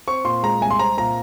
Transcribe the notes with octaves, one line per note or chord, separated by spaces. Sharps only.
C4 C#6
A#2 C6
G#3 A#5
C2 G#5
C6
C4 A#5
A#2 A#5